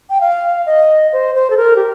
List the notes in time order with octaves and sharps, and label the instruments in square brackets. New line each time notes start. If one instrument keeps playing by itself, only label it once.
[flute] G5
F5
D#5
C5
C5
A4
A#4
G4